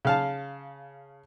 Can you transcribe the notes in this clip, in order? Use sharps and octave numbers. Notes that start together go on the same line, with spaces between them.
C#3 F5 A5